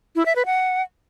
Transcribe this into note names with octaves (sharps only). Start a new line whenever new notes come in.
E4
E5
B4
F#5